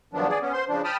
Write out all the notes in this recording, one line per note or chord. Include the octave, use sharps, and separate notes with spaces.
G2 D#3 F3 F#3 B3 D4
G#4 D5
B3 C#4
C5 C6
C#3 F3 D4
G5 A5 B5 D#6 F6